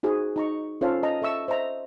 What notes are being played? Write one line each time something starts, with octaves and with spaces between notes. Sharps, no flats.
D#4 F#4 G#4 C5
D#4 A#5 C#6
C#4 F4 A4 C5 C#5 F5
D#5 A5 A#5
A4 E5 C#6 E6
C5 D#5 E5 A#5